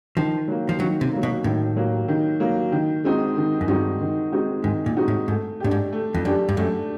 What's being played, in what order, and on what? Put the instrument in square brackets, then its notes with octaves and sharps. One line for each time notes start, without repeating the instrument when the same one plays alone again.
[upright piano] D#3 [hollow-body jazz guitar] F3
[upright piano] F#3 A#3
[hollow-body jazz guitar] F3
[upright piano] D#3 [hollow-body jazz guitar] F#3
[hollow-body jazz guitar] C3
[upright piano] F#3 A#3
[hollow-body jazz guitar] B2
[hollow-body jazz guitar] A2 [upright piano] D#3
[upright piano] F#3 A#3
D#3
F#3 A#3
D#3
G#3 C4 D#4 F#4
D#3
[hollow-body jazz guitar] F#2
[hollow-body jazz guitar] G2 [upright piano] G#3 C4 D#4 F#4
[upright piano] D#3
G#3 C4 D#4 F#4
[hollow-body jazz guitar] G#2 [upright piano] D#3
[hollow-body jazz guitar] A#2
[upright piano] G#3 C4 D#4 F#4
[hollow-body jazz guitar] A2
[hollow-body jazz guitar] G#2 [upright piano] A3
[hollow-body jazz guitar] A2 [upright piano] D4 G4
[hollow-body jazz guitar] G#2
[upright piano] A3
[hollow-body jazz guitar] F2
[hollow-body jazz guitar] F#2 [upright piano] D4 G4
[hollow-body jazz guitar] G2
[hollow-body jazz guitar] F#2 [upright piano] A3